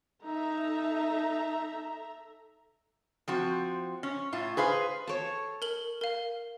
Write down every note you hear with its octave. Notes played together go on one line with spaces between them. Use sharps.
D#4 A4 E5 A#5
F3 C4 F#4
C#4
A2 F4
G#4 B4 C5 F5
A4 C#5
A#4 F#7
A#4 F5